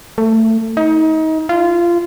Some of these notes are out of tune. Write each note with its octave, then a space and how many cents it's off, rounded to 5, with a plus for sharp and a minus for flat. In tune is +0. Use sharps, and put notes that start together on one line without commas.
A3 +20
D#4 +30
F4 -20